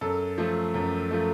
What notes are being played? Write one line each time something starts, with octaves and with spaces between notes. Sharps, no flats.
F#2 A4
F3 A3
F#2
F3 A3